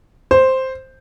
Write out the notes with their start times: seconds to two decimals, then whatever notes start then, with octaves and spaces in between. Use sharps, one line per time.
0.31 C5